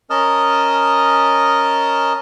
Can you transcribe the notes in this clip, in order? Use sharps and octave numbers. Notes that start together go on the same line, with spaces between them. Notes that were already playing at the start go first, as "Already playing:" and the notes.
C#4 A#4 D#5 A5 D#6 F6